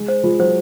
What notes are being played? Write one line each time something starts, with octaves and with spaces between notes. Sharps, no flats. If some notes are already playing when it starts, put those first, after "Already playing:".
Already playing: G#3
C5
G#3 F4
F#3 C5